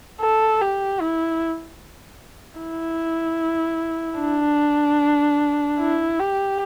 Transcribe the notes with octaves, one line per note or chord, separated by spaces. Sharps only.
A4
G4
E4
E4
D4
E4
G4